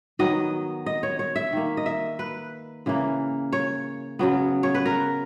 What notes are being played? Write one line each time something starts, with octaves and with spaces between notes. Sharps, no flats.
D#3 F#3 B3 D#5
D#5
C#5
C#5
E5
D#3 A#3
D#5
E5
B4
C#3 E3 A#3
C#5
C#3 F#3 B3
C#5
B4
A#4